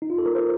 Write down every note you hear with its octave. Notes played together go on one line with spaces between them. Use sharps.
D#4
F4
A4
A#4
C5